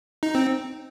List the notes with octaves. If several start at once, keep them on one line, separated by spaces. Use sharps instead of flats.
D#4
C4